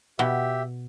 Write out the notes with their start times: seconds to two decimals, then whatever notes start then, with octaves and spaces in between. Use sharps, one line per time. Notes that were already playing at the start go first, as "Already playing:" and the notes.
0.19 B2 G4 E5